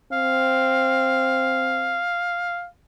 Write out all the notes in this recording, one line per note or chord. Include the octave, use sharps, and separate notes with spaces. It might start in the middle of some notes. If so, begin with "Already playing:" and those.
C4 F5